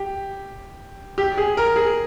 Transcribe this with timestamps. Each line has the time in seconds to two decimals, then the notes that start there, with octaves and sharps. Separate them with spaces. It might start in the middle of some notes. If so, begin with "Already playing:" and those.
Already playing: G4
1.18 G4
1.37 G#4
1.57 A#4
1.76 G#4